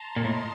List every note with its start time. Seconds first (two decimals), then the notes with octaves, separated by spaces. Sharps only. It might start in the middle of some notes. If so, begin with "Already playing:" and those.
Already playing: A5 A#5 C6
0.13 A#2 D#5
0.24 A2